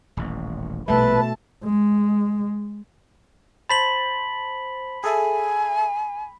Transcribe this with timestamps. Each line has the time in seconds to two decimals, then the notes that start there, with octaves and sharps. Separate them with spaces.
0.17 D#1 A1
0.88 A#1 B2 G3 A3 B4 E5 A5
1.64 G#3
3.69 C5 A5 B5 B6 F#7
5.04 G#4 A4 E5 G#5